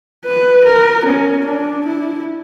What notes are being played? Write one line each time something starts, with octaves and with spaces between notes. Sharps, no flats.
B4
A#4
C#4
D4
E4